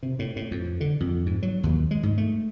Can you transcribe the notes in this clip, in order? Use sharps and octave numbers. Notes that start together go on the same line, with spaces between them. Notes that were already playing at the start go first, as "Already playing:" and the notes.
C3
A2
A2
F2
D3
F2
G#2
F#3
D#2
G#3
G#2
A3